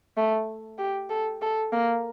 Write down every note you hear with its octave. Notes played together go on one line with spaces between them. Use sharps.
A3
G4
A4
A4
A#3